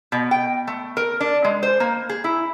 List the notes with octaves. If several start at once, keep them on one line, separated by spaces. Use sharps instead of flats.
B2
G5
A3
A#4
D4
G#3
C5
A#3
G#4
E4